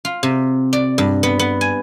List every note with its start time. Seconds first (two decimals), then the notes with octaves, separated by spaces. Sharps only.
0.05 F4
0.23 C3
0.73 D5
0.98 G2
1.23 B3
1.39 B3
1.61 G#5